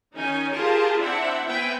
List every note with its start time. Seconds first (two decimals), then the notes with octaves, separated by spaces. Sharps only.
0.14 D#3 C#4 D#4 G#5
0.54 F4 G4 G#4 A#4 A5
0.99 C4 D4 E4 E5 F#5
1.46 B3 C4 B4 E5 G5 G#5